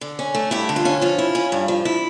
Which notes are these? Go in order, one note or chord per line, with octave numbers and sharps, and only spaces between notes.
D3
C#4
A3
G2 E4 G4
D3
F4
C#4
F3 F4
E4
C#4
G2
F3
E4